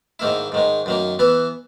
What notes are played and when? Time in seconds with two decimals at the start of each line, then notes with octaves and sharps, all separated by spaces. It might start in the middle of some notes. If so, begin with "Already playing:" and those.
0.19 G#2 D#3 A#3 E4
0.52 G#2 D#3 G#3
0.86 F#2 D#3 A#3
1.19 E3 B3 E4